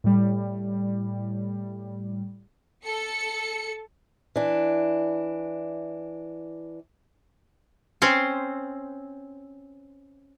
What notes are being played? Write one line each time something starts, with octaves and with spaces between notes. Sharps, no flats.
A2 G3
A4 C#7
E3 D4
C4 C#4 C5